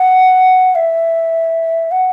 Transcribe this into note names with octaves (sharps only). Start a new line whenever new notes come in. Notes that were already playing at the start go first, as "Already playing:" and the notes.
Already playing: F#5
E5
F#5